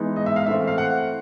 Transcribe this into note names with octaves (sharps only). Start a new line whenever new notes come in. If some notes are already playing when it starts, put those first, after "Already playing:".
Already playing: E3 G#3 B3 D#4
D#5
E5
F5
E3 A3 C4 E5
F5
F#5